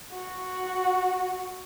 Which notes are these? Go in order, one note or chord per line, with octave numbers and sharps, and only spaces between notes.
F#4